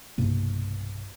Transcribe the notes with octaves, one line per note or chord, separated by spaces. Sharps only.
B1 G2 C3 A#3